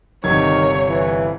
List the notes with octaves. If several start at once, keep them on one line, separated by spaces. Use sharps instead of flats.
G1 C3 D#3 C#5 G#6
E3